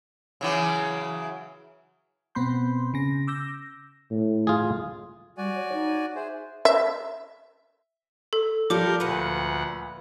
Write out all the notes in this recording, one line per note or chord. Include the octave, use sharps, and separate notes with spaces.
C#3 E3 F#3
B2 B3 C4 B5 C6 G6
C#3 A#6
D6 E6 G6 A#6
A2
F4 G#4
G3 F#4 D5 G#5
C#5
D#4
G#4 C5 E5
E5
A4
F3 G3 A4 A#4 D5 D6 G6
D2 A#2 B4 F#5